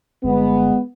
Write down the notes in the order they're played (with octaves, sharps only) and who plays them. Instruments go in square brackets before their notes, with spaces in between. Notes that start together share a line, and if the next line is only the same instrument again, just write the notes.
[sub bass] G1 [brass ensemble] G#3 B3